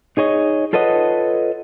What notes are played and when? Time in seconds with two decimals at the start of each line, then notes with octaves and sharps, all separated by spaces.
0.17 D#4 G#4 C#5 D#5
0.73 F4 A4 B4 C#5 D#5 F#5